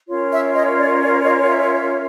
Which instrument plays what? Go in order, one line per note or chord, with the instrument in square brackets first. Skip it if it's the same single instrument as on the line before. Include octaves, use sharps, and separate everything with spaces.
[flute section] C#4 F4 A#4 C#5
E5
D#5
D5
D5
D#5
E5